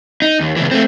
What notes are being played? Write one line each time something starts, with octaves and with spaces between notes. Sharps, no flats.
D#4
D#2
C#2 E3
A3 C4